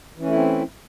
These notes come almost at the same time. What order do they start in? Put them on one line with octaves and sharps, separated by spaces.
E3 C#4 A3 E4 C4